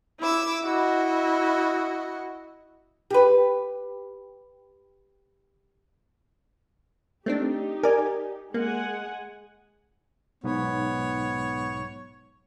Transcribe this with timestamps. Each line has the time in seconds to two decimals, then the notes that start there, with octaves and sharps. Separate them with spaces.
0.20 E4 D6 E6
0.65 E4 F#4 D#5
3.11 G4 B4
7.26 A3 C4 D4 D#4 G4
7.83 A#4 D5 G#5
8.54 G#3 A#3 F#5 G#5
10.44 B1 G#2 B3 C#5